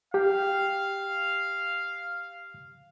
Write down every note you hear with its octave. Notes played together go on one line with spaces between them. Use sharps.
G4 F5 G5